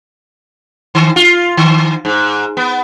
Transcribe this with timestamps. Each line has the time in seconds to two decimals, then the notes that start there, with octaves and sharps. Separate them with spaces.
0.95 D#3
1.16 F4
1.57 D#3
2.05 G#2
2.57 B3